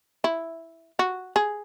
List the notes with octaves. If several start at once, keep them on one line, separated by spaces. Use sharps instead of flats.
E4
F#4
G#4